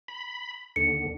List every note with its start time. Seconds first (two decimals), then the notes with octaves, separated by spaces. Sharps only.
0.08 B5
0.76 D#2 D3 C#7